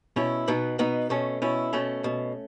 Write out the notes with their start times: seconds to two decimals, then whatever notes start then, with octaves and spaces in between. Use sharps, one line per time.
0.16 B2 C#4 E4
0.48 B2 B3 D#4
0.79 B2 B3 D#4
1.10 B2 A3 C#4
1.42 B2 C#4 E4
1.73 B2 A3 C#4
2.04 B2